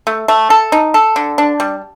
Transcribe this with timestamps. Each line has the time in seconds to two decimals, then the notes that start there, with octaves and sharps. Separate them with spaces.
0.07 A3
0.28 A3
0.50 A4
0.72 D#4
0.94 A4
1.16 D3
1.38 D4
1.60 G3